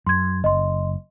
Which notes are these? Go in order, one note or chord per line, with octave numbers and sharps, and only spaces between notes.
F#2 C6 G#6
F#1 D#5 C6